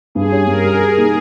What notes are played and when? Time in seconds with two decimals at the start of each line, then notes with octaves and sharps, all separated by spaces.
0.15 G2 G#4
0.32 G3 C#4
0.47 G2 A#4
0.64 G3 C#4
0.80 G3 G#4
0.97 A#3 D#4